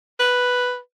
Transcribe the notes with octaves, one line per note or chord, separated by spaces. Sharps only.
B4